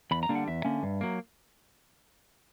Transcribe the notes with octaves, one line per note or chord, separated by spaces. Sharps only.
E2 B5
A#5
D3 G3 A#3 D4
F#5
E2 E5
D3 A#3 C#4
G2
F#3 A#3